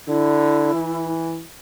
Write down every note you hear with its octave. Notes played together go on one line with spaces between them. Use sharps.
D3 E4
E3